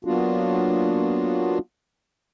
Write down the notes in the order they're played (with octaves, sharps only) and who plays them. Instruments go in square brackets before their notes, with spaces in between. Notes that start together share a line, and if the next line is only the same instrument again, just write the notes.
[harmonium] F#3 A#3 B3 D4 F4 F#4